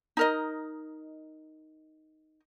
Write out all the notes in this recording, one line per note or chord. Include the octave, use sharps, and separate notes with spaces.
D#4 A#4 D#5